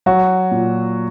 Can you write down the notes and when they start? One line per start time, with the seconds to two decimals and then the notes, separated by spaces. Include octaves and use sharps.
0.06 F#3 F#4
0.51 A#2